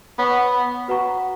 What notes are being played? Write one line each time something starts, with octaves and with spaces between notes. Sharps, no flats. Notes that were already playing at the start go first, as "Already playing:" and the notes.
B3 C#5 F#5 C#6
F#4 B4 F#5 A#5 C#6